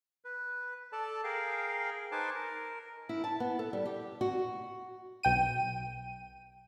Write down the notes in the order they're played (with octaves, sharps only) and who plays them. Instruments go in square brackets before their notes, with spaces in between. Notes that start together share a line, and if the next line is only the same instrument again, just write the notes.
[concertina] B4
A4 D5 A5
G#4 A#4 F5 G5
D#4 B4 C5 G#5 A5 D6
A#4
[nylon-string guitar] E4
A5
B3
A4
G3
G4
F#4
[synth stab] B1 G5 D#7